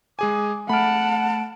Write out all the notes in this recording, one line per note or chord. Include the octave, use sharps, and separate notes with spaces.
G#3 G#4 G#5 D6
A3 F#5 A5 B5 F6 D7